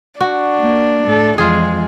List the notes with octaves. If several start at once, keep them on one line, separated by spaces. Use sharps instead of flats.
D4 F#4
A#3
A2 A4
F2 E3 G#3 F4 G#4